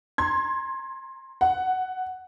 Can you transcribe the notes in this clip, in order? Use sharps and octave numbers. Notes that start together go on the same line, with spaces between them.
A#5 C6 G#6
F#5